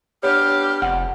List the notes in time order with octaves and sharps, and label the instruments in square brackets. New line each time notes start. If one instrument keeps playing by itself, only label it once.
[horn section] B3 D4 G4 [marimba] C#5 [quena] F6
[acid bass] F1 [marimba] F#5